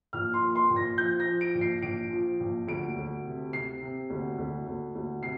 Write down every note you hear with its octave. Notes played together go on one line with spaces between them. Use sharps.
A#1 F6
C6
A#2
C6
A#1
A#6
F3 G6
A#6
F3
D7
A#1
C7
A#1 D7
F3
A#1
D2 D7
D2
C3
C3 C7
C3
D2
D2
D2
D2
C3 C7